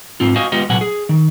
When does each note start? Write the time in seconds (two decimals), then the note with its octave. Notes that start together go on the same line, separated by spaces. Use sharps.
0.20 G#2 C4 F4
0.36 F#4 C5 D#5 F5 G#5
0.52 G#3 B3 F4 G4 D#5
0.69 C2 A#2 F#3 B3 F#5 G#5
0.81 G#4
1.09 D#3